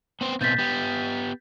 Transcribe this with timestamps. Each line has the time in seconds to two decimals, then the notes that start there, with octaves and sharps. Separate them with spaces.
0.21 B3 C4 C5
0.41 B2 A#3 C4 G6 A6 B6
0.58 B3 G4